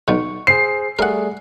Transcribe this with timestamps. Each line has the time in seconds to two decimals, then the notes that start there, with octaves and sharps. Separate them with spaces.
0.08 B1 B2 C#6
0.47 G#4 C5 C7
0.99 G3 A3 G#4 A#4 F#5